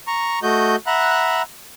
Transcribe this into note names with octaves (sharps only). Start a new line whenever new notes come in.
A#5 C#6
A3 F#4 D#5 G6
E5 F#5 A#5 B5 F#6